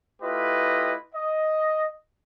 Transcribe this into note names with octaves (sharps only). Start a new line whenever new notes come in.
A3 E4 F4 G4 B4 D#5
D#5